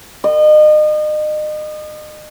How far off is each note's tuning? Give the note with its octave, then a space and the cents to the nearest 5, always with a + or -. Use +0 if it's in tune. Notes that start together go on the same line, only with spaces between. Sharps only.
D#5 -35